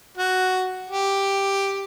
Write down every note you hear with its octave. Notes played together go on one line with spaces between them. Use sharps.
F#4
G4